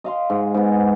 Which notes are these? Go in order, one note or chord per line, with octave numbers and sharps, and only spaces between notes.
D#5 F5 C6
G#2
G#2 B3